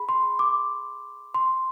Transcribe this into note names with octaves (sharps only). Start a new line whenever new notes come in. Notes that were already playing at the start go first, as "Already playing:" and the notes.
Already playing: G#4 B5
C6
D6
C6